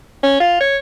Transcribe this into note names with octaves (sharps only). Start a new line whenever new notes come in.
C#4
F4
C#5